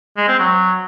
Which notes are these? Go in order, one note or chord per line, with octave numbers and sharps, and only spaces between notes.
G#3
C4
F#3